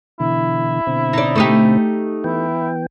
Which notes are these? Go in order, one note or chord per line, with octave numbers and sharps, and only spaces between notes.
B2 D3 E3 E4
B2 D3 C4
D#4 D5
A3 D#4 G4
E3 B3 E4 G5